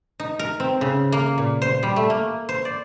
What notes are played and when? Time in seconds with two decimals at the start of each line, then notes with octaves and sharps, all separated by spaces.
0.20 D#4
0.39 A#4
0.60 C4
0.81 C#3
1.12 A#3
1.38 A#2
1.62 C5
1.83 G3
1.96 A3
2.10 A#3
2.49 C5
2.65 D5